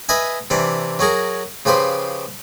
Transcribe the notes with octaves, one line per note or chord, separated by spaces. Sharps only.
B4 D#5 E5 G#5
C3 E3 D4
F#3 F#4 G#4 A#4
C#3 F3 G4 B4 C5